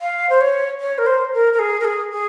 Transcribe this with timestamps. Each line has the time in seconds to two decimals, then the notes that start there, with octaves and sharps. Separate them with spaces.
0.01 F5
0.29 C5
0.41 C#5
0.80 C#5
0.98 A#4
1.06 C5
1.33 A#4
1.53 A#4
1.59 G#4
1.80 A#4
1.84 G#4
2.11 G#4